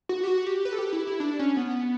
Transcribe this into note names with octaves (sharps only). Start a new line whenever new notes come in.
F#4
G4
F#4
G4
B4
A4
G4
E4
E4
D4
C#4
B3